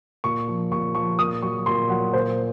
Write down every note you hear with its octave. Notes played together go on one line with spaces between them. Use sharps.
A#2 C#6
F3
A#2 C#6
F3 C#6
A#2 D#6
F#3 C#6
A#2 C6
F#3 F#5
A#2 C5